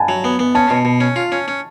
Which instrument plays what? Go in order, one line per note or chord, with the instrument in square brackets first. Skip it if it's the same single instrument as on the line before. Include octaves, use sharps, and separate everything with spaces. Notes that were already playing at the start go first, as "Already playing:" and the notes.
Already playing: [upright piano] F#5 G#5 A5 B5
[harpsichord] F#3
B3
B3
[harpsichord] C#4 [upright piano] A5
[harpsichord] B2
B2
C#4
F4
C#4
C#4